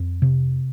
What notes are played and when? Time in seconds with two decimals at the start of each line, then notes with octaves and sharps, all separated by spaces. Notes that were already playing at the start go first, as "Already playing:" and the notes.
Already playing: F2
0.22 C3